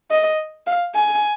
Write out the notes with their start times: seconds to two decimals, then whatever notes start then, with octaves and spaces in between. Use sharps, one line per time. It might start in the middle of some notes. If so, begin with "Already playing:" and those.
0.11 D#5
0.67 F5
0.95 G#5